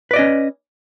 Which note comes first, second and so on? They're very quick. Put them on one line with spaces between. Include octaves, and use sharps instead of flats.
B4 D5 D#5 C#4